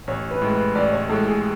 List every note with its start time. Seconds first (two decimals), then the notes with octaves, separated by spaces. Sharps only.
0.07 A1 C#5
0.31 B4
0.42 A2 G#3
0.53 B4
0.75 A1 D5
0.92 C#5
1.09 A2 G#3 A4
1.26 G#4